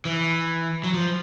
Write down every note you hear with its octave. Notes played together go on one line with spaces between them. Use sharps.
E3
F#3
F3